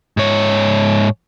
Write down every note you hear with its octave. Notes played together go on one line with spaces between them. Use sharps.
G#2 C#5